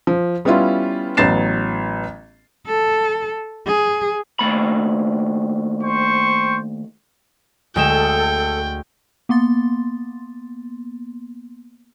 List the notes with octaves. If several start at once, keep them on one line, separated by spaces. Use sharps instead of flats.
F3
G3 B3 C#4 E4 F4
A1 F#3 B3 A6 C7 E7
A4
G#4
D#2 A3 B5
C5 G5 C#6
D2 G#3 A4 G5 E7
A#3 B3 C6 A6